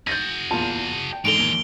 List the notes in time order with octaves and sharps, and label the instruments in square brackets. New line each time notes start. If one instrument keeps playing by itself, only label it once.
[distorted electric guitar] F#4 G#4 [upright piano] G6 A6 A#6
[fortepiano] E2 A#2 F4 [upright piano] A5
[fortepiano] G5
[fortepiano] G#2 D3 [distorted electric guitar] E3 G#3 [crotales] D7 F7 G7
[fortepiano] D#2 A#2